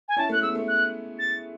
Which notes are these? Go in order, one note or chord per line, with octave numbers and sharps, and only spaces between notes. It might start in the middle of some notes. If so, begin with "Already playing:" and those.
G#5
C#4 E4 A5
A3 C#4 F#6
G#3 B3 E6
A3
F#6
A6